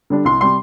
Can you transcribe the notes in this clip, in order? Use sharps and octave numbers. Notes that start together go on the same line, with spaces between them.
D3 G3 D4
C2 C6
C3 G3 C6